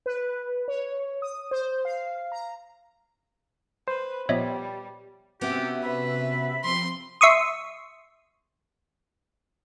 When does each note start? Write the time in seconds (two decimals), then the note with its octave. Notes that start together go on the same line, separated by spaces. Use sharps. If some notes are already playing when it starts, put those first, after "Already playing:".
0.06 B4
0.68 C#5
1.22 D#6
1.51 C5
1.85 F5
2.32 A#5
3.88 B4 C5
4.29 A#2 F3 G3 B3 C#5 D#5 E5
5.41 C3 B3 C#4 F#4 G4 E5
5.83 B4 B5
6.64 F3 C4 C6
7.21 E5 C6 C#6 D#6